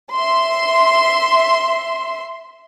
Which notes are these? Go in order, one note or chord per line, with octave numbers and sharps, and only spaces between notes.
E5 C6